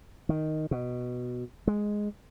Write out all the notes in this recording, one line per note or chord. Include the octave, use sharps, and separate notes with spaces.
D#3
B2
G#3